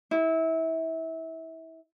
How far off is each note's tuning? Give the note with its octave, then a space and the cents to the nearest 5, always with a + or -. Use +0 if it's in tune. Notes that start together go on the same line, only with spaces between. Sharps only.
E4 -25